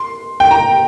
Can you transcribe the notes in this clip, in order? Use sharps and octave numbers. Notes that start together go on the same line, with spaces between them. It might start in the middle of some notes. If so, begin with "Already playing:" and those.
Already playing: C6
G5
A#5